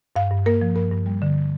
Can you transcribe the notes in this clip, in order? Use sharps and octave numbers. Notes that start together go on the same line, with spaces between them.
G2 F5
G2
A#3 A#4
F3
G2 A#4
G2
G3
D3